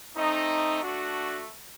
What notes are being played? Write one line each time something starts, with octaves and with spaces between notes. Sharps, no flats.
A3 C4 D#4
A3 D4 F#4